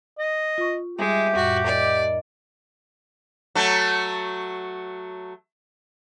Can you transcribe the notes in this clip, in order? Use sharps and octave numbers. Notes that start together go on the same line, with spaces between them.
D#5
F4 C#6
G3 G#3 G4 E5 A#5
F2 A2 F#4 B5
D#4 A#4 D5 G#5
F#3 A3